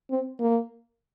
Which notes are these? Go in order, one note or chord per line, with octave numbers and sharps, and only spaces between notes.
C4
A#3